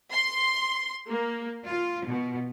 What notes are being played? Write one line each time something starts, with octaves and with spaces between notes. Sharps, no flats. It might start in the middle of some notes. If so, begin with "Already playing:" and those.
C6
A#3
F4
B2